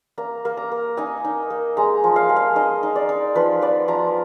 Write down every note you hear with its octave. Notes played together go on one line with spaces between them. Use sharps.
A#3 A#5
A#3
A#5
A#3
D#4 G#5
D#4
A#3
G#3 A#5
F3
F5
G#3
F5
D#4 D#5
D#4
D5
D#4
F3 B4
B3 D5
F3 A#5